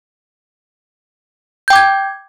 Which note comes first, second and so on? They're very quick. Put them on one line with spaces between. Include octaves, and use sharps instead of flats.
G6 G5 D6 G#6